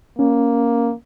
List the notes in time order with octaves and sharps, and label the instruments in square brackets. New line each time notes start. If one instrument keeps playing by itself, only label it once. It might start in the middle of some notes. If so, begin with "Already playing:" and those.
[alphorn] A#3 [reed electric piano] C#4